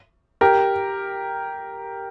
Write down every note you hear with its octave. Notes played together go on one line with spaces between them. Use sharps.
G4 A#4